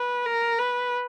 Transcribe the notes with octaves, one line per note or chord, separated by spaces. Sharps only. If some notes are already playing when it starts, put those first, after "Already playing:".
Already playing: B4
A#4
B4